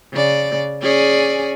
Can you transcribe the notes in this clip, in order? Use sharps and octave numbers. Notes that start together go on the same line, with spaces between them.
C#3 D5
C#4 G#4 D5